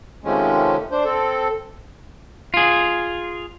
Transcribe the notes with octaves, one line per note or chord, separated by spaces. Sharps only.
C3 D#3 F3 G#3 A3 C#4
D4 C5
C4 A4
F4 G#4